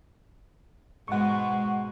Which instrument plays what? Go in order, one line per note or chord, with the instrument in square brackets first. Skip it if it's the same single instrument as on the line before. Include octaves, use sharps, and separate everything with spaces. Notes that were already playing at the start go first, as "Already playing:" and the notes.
[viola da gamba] G#2 B2 G#3 [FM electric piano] F#5 C#6